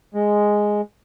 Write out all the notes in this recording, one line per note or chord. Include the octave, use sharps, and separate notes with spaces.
G#3